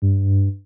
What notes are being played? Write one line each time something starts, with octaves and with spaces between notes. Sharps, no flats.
G2